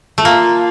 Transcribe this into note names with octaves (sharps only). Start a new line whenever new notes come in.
A3
A#3 F4